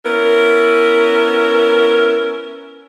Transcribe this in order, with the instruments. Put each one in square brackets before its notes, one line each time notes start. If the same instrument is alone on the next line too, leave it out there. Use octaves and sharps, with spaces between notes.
[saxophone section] B3 C#4 E4 A#4